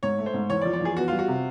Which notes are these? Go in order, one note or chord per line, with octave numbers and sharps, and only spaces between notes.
G#2 C#5
A3
C5
G#2
E2 C#5
D5
F3
D5
E2 G#4
B3 F#4
G3 F4
F#4
C3